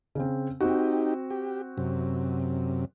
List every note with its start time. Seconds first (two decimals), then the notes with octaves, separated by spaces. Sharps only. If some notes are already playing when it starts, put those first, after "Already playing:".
0.15 C#3 C4
0.61 C4 D#4 F#4 G4
1.30 G4
1.77 F#2 C3